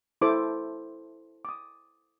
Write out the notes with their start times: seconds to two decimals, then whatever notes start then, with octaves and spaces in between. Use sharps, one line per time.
0.21 E4 A4 C5 D6
1.45 D6
1.49 D#6